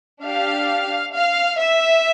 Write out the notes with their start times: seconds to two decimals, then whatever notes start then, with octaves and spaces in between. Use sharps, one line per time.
0.24 D4 G4 F5
1.14 F5
1.59 E5